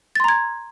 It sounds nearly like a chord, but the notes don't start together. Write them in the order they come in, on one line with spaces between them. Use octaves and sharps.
A6 C6 A#5 G#6